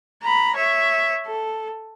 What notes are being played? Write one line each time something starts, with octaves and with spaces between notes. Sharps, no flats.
A#5 B5
C#5 E5
A4